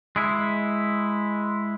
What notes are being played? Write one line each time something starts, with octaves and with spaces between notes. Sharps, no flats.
G#3 E4